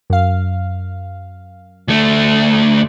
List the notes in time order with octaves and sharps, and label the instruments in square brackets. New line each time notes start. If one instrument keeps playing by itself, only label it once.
[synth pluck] F#2 F5
[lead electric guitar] D2 A3